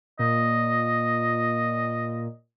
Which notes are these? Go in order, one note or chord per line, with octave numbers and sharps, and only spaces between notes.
A#2 D#5